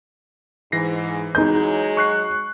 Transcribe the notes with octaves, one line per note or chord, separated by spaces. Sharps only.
G#2 E3 A#6 C7
F#3 G#3 D#4 G6
C#6 F#6 C7